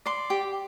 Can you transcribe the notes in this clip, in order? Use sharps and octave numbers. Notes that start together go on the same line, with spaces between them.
D5 C6
G4